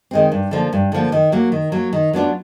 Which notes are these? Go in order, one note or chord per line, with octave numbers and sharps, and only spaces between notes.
D#3 G#3 C4
G2
D3 F3 A#3
G2
D3 F3 A#3
D#3
F#3 A#3
D#3
F#3 A#3
D#3
F#3 B3 D4 F4